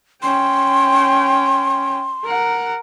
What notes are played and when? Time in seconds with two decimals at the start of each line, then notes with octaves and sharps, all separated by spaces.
0.22 C#4 G5 C6
2.24 A#4 F#5